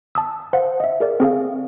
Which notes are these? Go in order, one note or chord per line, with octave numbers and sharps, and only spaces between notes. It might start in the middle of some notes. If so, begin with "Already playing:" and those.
A5 D#6 E6
C5 F5 F#5
D#5 E5
G#4 A#4 D5
C4 G#4 A4 F5